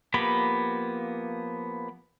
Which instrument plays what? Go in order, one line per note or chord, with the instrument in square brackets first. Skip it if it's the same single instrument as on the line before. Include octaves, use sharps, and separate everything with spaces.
[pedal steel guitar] F3 A#3 B3 G4 B5